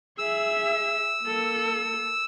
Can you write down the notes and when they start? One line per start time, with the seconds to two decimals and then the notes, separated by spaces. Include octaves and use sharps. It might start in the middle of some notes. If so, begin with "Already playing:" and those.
0.19 G#4 E5 E6
1.24 A#3 A4